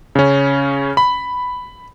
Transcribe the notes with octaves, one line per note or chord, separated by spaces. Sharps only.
C#3 C#4
B5